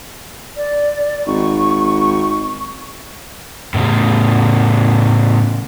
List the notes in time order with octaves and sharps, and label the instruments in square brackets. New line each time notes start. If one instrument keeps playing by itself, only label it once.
[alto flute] D5
[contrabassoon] G#1 [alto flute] C#6
[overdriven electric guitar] A2 C#3